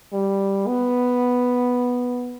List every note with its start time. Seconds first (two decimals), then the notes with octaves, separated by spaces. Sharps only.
0.13 G3
0.67 B3